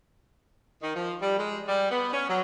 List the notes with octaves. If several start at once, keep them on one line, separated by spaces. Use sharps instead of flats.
D#3
F3
G3
G#3
G3
B3
C#4
F#3